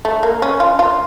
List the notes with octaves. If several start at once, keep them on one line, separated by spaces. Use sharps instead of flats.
A3
A#3
C#4
F4
F4